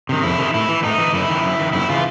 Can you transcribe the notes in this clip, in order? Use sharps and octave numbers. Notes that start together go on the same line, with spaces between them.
C3 D#3
F2 E4
C3 D#3
A2 E4
E3
A2 D#4
E3
F#2 E4
D#3
F#2
D#3
F#2 E4
C#3 E3 F4